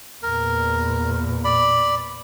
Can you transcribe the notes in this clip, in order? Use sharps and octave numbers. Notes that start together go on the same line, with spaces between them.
E2 A#2 A#4
D5 B5